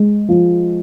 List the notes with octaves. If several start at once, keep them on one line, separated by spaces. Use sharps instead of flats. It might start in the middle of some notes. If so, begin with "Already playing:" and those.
Already playing: G#3
F3